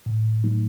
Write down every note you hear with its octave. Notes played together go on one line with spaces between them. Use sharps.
A2
F#3 A3 D#4